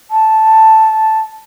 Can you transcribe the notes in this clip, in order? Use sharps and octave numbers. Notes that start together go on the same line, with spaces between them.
A5